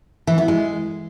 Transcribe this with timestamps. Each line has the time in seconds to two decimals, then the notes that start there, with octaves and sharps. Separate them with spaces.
0.27 E3
0.38 B3
0.48 G#3